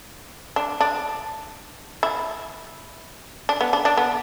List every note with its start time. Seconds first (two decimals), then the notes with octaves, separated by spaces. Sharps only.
0.56 D4
0.81 D4
2.03 E4
3.49 D4
3.61 B3
3.73 D4
3.85 D4
3.97 B3